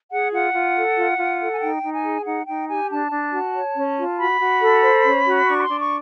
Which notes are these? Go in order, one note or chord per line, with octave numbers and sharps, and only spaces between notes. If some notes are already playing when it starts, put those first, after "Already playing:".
G#4 F#5
F4 F#5
F4
A4
F4
F4
A4
G#5
D#4 G5
D#4
G#5
G#4
D#4 F#5
D#4 G5
G4 G#5
D4 A5
D4
F#4
C#5
C#4
F4
F#4 B5
F#4
A4
C5
C#4
F#4
D4 C#6
B5
C6
D4
C#6